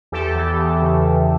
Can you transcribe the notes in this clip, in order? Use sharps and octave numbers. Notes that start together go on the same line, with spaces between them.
E2 G4 A4
E3
E2
C#3
E2